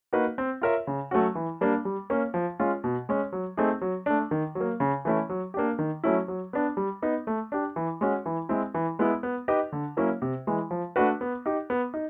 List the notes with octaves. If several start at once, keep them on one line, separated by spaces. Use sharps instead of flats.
A#3 D#4 F#4 B4
C4
F4 A#4 C#5 E5
C#3
F#3 A3 C#4 F#4
E3
G3 A#3 D4
G3
A#3 C#4
F3
G#3 C#4 F4
B2
G#3 C#4
F#3
A3 C4 D#4 G#4
F#3
A3 D4
D#3
F#3
A#3
C#3
E3 A3 C#4 E4
F#3
A#3 D4 G4
D#3
F#3 A3 C#4 E4
F#3
B3 D4
G3
B3 D#4
A3
D4 G4
E3
G#3 C#4 F#4
E3
G#3 C4 E4
E3
G#3 B3 E4
B3
D#4 G4 B4 D#5
D3
F#3 A#3 C#4 E4
C3
E3 G#3
F3
A3 D4 F#4 B4
B3
D#4 G4
B3
D#4